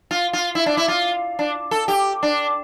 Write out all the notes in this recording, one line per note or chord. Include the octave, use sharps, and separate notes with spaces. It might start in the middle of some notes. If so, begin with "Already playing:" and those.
F4
F4
E4
D4
E4
F4
D4
A4
G4
D4